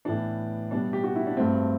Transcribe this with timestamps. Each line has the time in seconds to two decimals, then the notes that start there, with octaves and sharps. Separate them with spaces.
0.05 A2 E3 B3 D4
0.71 B2 G3 B3 D4
0.93 G4
1.04 F#4
1.16 E4
1.27 D4
1.37 G2 F#3 A3 C4